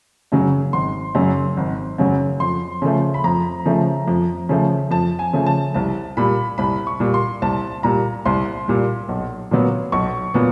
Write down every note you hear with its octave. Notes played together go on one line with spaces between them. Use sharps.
F#2 C#3 F#3
G#1 C6
F#2 C#3 F#3
G#1
F#2 C#3 F#3
F2 C6
C#3 F3 A3
B5
F2 A#5
C#3 F3 A3
F2
C#3 F3 A3
F2 A5
G#5
C#3 F3 A3
A5
C2 A5
A#2 G3 B5
C2 B5
C#6
A#2 G3
C6
C2 A5
A#2 G3 A#5
C2 C6
A#2 G3
B1
A#2 F#3 B3
B1 C#6
A#2 F#3 B3